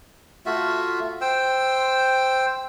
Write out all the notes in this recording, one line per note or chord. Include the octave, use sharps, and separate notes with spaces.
A3 F4 F#4 E5
C5 G5 E6